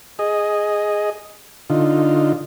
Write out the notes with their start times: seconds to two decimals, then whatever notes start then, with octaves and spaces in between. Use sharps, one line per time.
0.19 G#4 D#5
1.70 D3 D#4 F4